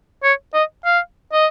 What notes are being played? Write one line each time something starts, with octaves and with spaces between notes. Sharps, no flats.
C#5
D#5
F5
D#5